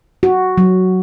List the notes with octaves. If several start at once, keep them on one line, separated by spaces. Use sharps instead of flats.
F#4
F#3